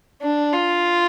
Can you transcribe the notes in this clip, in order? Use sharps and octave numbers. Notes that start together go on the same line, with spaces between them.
D4
F4